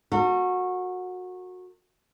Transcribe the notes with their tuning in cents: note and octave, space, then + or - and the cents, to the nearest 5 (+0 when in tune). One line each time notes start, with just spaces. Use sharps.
F#4 -20 A#4 -45